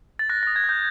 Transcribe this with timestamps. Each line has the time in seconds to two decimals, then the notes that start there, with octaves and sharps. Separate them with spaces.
0.19 A6
0.30 F#6 A#6
0.43 D#6 A#6
0.56 G#6
0.64 F#6
0.69 G6